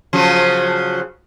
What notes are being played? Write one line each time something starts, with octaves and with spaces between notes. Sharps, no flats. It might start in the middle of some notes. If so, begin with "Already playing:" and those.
C#3 F3 F#3